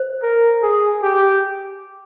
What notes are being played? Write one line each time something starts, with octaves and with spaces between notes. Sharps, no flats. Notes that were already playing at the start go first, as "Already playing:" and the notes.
Already playing: C5
A#4
G#4
G4